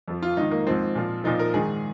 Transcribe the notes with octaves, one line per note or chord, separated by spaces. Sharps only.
F2 F3
F4
G#2 D#3 D#4
A#3
G#2 F3 C4
A#2 F3
A#2 F3 D#4
A#4
G#2 D#3 G#4